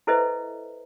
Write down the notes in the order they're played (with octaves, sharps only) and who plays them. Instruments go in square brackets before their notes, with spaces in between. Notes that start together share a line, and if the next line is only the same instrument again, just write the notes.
[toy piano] E4 A4 B4 C5 D#5 E5